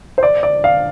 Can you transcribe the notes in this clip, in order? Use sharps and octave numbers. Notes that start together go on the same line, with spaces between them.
C5
D5
D5
F5